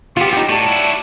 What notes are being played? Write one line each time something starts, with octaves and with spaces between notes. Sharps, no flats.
F#3 B3 F4 G4
D#4 G4
A2 C#5 D5 A5
E4 F#4